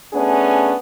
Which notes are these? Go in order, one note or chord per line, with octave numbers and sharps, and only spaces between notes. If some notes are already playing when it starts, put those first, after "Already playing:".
A3 B3 C#4 D4 G#4